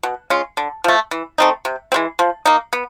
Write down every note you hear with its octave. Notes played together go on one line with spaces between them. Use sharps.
B2
G#3 C#4 F4
D3
F3 A3
E3
A3 C4 D#4
C3
E3 G#3 C4
F3
A#3 D#4
B3